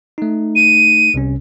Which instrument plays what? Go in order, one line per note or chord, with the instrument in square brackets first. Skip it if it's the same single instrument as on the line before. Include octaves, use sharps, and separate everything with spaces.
[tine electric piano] A3 D#4
[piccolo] D#7
[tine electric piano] C2 C3 C#4